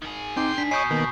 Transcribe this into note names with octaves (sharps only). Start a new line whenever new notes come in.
D#3 G#4
C4 D#4 G5 C6 D6
D4 B6
B2 C#5 D#5 G#5 C#6 D#6 G6 C7
D#3 A#3 B3